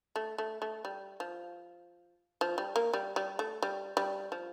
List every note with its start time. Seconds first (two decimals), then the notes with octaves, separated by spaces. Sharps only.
0.16 A3
0.38 A3
0.62 A3
0.85 G3
1.20 F3
2.41 F3
2.58 G3
2.76 A#3
2.94 G3
3.16 G3
3.39 A3
3.63 G3
3.97 G3
4.32 F3